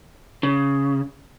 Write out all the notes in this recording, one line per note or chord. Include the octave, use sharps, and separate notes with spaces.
C#3